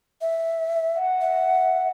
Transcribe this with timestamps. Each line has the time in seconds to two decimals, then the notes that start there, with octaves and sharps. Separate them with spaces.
0.21 E5
0.95 F#5
1.21 E5